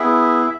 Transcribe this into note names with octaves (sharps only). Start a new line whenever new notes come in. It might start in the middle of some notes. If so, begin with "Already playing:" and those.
Already playing: B3 E4 G#4 E5